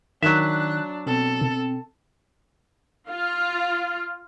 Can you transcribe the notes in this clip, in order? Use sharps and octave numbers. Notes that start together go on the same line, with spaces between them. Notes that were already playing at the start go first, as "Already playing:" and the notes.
D#3 F#3 D4 E5 F#6
B2 C4 A4
F4